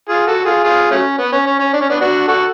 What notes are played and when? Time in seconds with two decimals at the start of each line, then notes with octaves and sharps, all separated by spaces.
0.09 F4 G#4
0.27 F#4 A4
0.45 F4 G#4
0.64 F4 G#4
0.91 F#3 A3 C#4
1.19 B3
1.33 C#4
1.46 C#4
1.60 C#4
1.74 D4
1.81 C#4
1.89 B3 D4
2.01 D4 F#4
2.28 F#4 A4